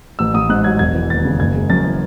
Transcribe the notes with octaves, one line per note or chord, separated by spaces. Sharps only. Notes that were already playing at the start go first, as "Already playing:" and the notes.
A1 E6
A1 D#6
G#2 F#6
F#3 G#6
E1 G#6
E3
D#2 A6
C#3
F#1 G#6
G#3
F#2 A6
E3